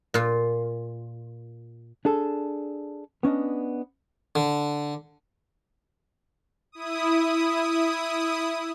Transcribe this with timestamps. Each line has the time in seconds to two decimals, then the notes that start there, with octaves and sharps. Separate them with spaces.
0.14 A#2 F4
2.05 D4 G#4 A4
3.23 B3 C#4 D4 D#5
4.35 D3
6.72 E4 D#6